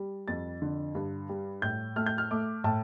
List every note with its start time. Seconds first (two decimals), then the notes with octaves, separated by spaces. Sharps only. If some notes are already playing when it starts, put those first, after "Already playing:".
Already playing: G3
0.28 F2 A6
0.62 D3
0.95 G2
1.29 G3
1.62 A2 G6
1.96 A3 F6
2.06 G6
2.18 F6
2.31 A3 D6
2.64 A2 A5